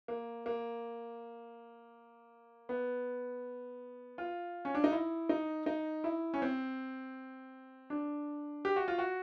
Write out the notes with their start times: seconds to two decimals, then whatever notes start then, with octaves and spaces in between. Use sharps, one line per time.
0.08 A#3
0.46 A#3
2.69 B3
4.18 F4
4.65 C#4
4.75 D4
4.84 D#4
4.92 E4
5.29 D#4
5.66 D#4
6.04 E4
6.34 C#4
6.42 C4
7.90 D4
8.65 G4
8.76 F#4
8.88 F4
8.98 F#4